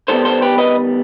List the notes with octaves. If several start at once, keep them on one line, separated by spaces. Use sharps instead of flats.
D#3 G3 B3 A4 C5
A4 C5
G4 B4
B4 D#5